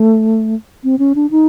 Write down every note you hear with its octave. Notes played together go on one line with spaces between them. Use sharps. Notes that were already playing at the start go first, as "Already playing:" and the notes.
Already playing: A3
C4
C#4
D4
D#4